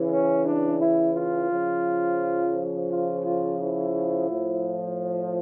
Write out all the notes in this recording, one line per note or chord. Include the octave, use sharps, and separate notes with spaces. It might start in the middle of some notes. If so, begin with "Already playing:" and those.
Already playing: C#3 E3
C#4
D4
E4
F4
C#3 F3
F4
F4
E4
A2 F3